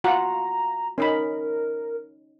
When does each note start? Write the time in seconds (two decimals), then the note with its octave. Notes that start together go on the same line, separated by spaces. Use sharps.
0.04 F4 F#4 F#5 A#5
0.98 C#4 D#4 A#4 B5